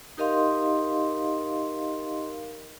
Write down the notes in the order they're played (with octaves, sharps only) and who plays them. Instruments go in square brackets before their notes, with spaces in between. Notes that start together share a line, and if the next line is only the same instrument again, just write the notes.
[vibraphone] D#4 G4 A#4 D#5 F5 C6